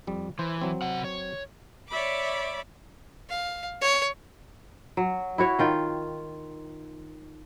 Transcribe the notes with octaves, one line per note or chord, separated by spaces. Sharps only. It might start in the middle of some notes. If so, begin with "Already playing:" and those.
F2 G3
E3 C5
F#3 C4
C3 F#5
C#5
C#5 D5 E5 B5 D6
F5
C#5
F#3
E4 F#4 C#5
D#3 F4 G5